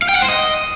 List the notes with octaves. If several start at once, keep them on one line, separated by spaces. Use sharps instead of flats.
F5
G5
F#5
C5
D#5